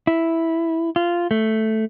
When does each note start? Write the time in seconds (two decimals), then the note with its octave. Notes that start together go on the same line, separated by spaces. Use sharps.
0.07 E4
0.96 F4
1.31 A3